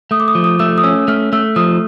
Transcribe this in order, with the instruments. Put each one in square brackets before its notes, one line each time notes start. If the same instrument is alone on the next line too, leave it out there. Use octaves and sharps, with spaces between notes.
[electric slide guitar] A3 [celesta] D#6
[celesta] D6
D#6
[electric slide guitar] F3
[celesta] D#6
[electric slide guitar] A3 [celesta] E6
[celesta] D#6
[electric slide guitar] C#4 [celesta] E6
[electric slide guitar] A3 [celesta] F6
[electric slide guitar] A3 [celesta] E6
[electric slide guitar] F3 [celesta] D#6